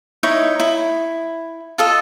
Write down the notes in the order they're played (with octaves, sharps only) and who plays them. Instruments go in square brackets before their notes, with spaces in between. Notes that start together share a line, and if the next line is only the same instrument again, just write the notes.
[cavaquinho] D#4 E4 C#5 D#5
E4
F4 A4 D#5